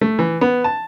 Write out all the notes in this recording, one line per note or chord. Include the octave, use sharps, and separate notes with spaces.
A3
E3
B3
A5